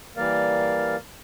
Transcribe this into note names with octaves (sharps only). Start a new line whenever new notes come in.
E3 G3 A#3 A#4 D5 F5